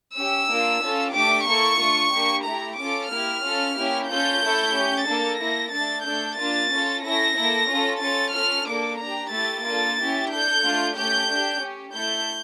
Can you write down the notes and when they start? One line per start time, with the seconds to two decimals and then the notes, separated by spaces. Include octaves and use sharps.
0.16 C#4 G4 E6
0.49 A#3 D4 F4
0.82 C#4 F4 A4
1.14 A3 D4 G4 D6
1.47 A#3 E4 A4 C#6
1.80 A3 D4 F4
2.13 A#3 D4 G4
2.45 A3 E4 G4 A#5
2.78 C#4 F4 A4 D6
3.11 A#3 E4 G4 F6
3.43 C#4 F4 A4
3.77 A#3 C#4 E4 G4
4.09 C#4 F4 A4 G6
4.42 A3 E4 A4
4.74 C#4 G4
5.07 A#3 D4 A4 A6
5.40 A#3 E4 A4 A#6
5.72 A3 D4 A4 A6
6.05 A3 D4 A4 G6
6.38 A#3 D4 F4 A6
6.70 C#4 F4 A4
7.03 C#4 E4 A4 A#6
7.36 A#3 E4 A4
7.69 C#4 F4 A4
8.01 C#4 F4 A4 A6
8.34 C#4 F4 A4 F6
8.67 A#3 D4 A4 D6
9.00 D4 G4 A#5
9.32 A3 E4 G4 A6
9.65 A#3 D4 F4 A4 A6
9.98 C#4 E4 G4
10.30 D4 A4 G6
10.63 A3 D4 F4
10.95 A3 C#4 G4 G6
11.29 D4 G4
11.62 C#4 G4
11.94 A3 E4 A4 G6